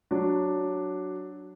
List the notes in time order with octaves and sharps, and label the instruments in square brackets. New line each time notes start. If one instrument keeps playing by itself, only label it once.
[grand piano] F#3 D4